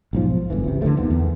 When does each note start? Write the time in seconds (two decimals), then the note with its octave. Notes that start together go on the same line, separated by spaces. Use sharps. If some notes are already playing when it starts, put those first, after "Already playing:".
0.13 B1 G#2 F3
0.50 G1 D3 E3
0.64 C#2 C3
0.82 D3 E3 F3 A3
0.97 D#2 D#3 B3
1.11 E2